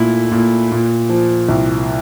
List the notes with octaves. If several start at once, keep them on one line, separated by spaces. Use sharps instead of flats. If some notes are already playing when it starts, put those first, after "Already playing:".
Already playing: A#2 A3 E4
A#2
A#2
F3
C2